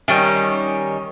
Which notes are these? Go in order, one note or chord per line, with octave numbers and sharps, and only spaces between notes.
D#3 G3 C#4